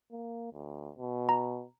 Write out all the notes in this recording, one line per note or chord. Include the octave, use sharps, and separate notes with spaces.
A#3
D2
B2
A#5